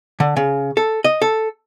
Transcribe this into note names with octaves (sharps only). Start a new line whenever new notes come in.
D3
C#3
A4
D#5
A4